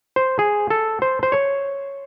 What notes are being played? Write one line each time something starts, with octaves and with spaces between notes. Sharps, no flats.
C5
G#4
A4
C5
C5
C#5